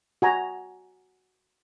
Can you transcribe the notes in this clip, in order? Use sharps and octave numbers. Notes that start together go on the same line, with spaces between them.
F#4 G#5 A#5